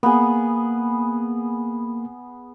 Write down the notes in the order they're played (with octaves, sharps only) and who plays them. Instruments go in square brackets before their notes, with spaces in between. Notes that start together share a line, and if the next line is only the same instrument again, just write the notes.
[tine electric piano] A#3 [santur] B3 G#4